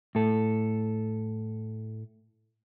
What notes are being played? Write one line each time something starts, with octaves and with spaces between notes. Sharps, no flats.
A2 A4